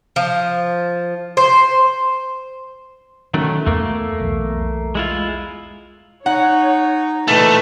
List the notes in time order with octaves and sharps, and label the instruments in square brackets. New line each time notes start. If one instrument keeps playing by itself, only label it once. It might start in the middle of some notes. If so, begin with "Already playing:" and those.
[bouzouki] F3
C5
[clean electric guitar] D#3 F#3 A3 [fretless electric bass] C#4
[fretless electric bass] E2 [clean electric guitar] A3 A#3
[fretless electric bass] B1 E2
[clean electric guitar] G#3 E4 F4
[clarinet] D#4 [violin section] C#5 [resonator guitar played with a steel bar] F#5
[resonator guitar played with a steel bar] A#2 E3 G#3 [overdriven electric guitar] A3 [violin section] B4